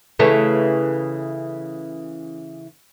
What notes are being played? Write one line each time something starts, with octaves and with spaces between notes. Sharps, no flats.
C#3 E3 A3